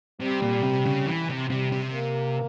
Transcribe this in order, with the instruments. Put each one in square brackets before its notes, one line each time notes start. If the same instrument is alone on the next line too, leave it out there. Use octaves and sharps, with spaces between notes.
[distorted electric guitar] C3 [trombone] G3
[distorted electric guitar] A#2
C3
C#3
E3
C3
[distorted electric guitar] C3 [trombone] G3
[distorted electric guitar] C3
[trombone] A#3